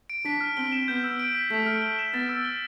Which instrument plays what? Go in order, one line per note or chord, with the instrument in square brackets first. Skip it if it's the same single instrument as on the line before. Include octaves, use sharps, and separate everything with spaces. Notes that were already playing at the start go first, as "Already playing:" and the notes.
[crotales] D7
[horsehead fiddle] D4 [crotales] B6
[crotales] F6
[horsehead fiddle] C4 [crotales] G7
[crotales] E7
[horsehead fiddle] B3 [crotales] G6
[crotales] E6
D7
B6
[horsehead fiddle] A3 [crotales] B6
[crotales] F6
G7
E7
[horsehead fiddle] B3 [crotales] A6
[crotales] E6
G7